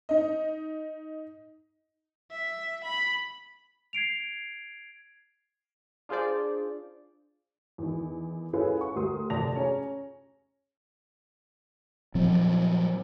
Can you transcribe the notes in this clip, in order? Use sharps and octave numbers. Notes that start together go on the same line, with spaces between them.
D#4 D#5
E5
B5
G#6 C7 D7 F7
D4 F4 G#4 C5 D5
E2 D#3
C#4 E4 F4 G#4 A4 B4
F#5 C#6
D2 G4 A#4 C6 D#6
F1 C3 D5 A5 A#6 F7
C#4 G#4 G#5 A#5
A#2 F3 F#3 C4